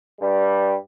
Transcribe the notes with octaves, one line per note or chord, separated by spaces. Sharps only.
G2 G3